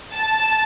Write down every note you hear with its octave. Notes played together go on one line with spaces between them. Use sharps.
A5